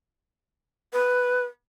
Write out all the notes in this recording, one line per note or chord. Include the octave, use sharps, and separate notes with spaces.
B4